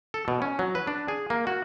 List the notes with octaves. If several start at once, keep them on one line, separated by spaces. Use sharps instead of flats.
A4
B2
C#4
F#3
B4
D4
G#4
A#3
F#4